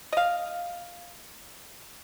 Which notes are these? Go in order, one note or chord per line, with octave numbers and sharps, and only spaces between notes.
D#5 F5